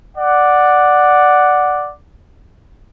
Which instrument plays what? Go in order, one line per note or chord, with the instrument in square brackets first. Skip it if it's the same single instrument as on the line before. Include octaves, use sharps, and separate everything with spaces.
[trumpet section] D5 F#5